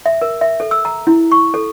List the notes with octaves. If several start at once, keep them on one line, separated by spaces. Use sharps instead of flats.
E5
A#4
E5
A4
E6
A#5
E4
C#6
A4